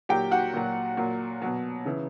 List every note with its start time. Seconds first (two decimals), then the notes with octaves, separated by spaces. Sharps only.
0.09 A#2 F#3 G4 G5
0.31 F#4 F#5
0.54 A#2 F#3
0.97 A#2 F#3
1.42 B2 F#3
1.85 C#3 E3